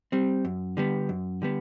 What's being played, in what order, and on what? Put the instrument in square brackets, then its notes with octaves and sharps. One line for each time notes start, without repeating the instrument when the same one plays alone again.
[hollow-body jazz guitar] G3 C4
F#2
D3 G3 B3
F#2
D3 G3 B3